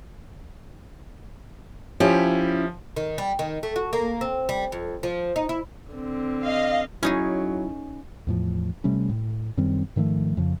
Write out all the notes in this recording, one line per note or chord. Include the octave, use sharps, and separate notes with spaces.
F3 C#4 E4 G4
D#3
G3
D#3
A3
F#4
A#3
C4
G3
F2
F3
D#4
E4
D3 C4
D#5 F5
F#3 C#4 D#4 E4 G#4
E2 A2 F3
C3 G3 A3 C#4
A2
F#2 D#3 G3 C4
G#2 D#3 F3 A3
F2 C#3 F3